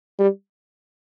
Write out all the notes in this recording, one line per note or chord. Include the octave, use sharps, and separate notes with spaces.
G3